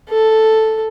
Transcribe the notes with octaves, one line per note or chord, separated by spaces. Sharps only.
A4